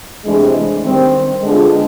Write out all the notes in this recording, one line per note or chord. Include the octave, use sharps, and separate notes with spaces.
C3 E3 G#3 A3 D4
D#3 G3 C4
D3 G3 G#3 B3 D4 F4